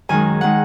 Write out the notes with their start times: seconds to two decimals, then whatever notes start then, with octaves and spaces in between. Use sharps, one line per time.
0.09 F#2 D#3 G#3 G#5
0.41 D#3 G#3 F#5